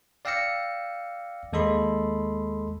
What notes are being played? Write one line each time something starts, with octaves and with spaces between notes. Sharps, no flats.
D5 F5 G5 E6 A#6 C#7
D#2 G#3 A4 D#5 B5 C6